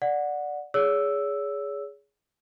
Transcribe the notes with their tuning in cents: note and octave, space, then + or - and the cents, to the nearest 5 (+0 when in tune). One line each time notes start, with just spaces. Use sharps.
D5 +0 F#5 -15
G#4 +0 C#5 +35 E6 +0